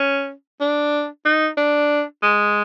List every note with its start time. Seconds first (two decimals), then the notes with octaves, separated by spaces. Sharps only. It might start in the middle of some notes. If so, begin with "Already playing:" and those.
Already playing: C#4
0.61 D4
1.25 D#4
1.57 D4
2.22 G#3